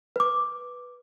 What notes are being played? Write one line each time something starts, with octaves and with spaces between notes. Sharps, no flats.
B4 D6